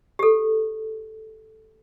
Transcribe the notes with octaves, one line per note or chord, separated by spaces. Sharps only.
G4 A4